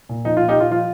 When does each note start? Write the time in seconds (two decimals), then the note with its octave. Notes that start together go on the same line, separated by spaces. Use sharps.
0.09 A#2
0.25 F3 D#4
0.37 F4
0.41 A#2
0.48 D#4 G4
0.56 A#2 F4
0.71 F3 F4